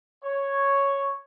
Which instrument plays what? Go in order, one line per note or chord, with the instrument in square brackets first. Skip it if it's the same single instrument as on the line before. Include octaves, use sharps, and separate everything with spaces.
[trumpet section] C#5